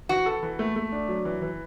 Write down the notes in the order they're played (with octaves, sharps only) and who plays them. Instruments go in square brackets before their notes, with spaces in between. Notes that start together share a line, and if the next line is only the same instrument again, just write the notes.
[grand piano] E3 [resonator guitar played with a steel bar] F#4
[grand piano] A4
E3
A3
A3
D4
F#3
E3
E3